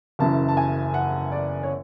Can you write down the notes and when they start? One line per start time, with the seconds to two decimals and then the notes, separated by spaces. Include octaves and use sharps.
0.19 F#1 F#2 C#3 E3 A5
0.48 A5
0.57 G#5
0.94 F#5
1.32 D5
1.63 C#5